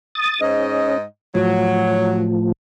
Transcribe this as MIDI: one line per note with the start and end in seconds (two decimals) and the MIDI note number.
0.15 0.41 87
0.15 0.41 93
0.41 1.02 44
0.41 0.98 61
0.41 1.02 75
1.35 2.52 45
1.35 2.52 53
1.35 2.33 54